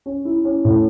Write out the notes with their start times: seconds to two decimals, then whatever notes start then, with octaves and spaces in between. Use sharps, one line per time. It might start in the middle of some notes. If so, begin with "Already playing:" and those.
0.06 C#4
0.25 E4
0.44 C#4
0.65 A2